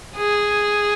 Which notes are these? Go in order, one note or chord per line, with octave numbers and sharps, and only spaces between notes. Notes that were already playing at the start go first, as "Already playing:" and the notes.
G#4